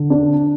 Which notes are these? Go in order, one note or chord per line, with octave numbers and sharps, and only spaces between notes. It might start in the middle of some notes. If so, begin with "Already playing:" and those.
Already playing: D3
D4